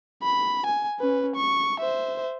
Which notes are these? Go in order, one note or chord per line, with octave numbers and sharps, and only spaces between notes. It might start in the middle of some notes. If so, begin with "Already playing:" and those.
B5
G#5
C#4 B4
C#6
C5 E5